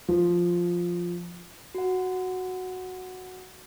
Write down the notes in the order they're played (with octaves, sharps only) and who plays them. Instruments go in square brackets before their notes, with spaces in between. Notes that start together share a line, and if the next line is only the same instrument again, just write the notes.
[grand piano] F3
[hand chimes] F#4 F#5